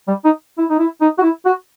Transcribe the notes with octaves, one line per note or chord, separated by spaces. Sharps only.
G3
D#4
E4
D#4
E4
D#4
F#4
E4
F#4